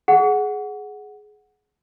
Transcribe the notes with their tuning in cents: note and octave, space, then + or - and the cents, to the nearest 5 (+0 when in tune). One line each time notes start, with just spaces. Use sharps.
G#4 +15 F#5 +0